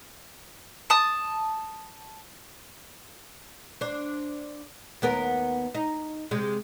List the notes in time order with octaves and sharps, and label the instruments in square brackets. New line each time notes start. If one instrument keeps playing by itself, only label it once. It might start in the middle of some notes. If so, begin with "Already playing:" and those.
[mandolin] A5 D#6
[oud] D4 C5
D#2 B3 A#4
D#4
C3 G#3